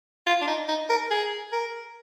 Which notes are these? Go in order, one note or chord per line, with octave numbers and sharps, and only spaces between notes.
F4
D4
D#4
D#4
A#4
G#4
A#4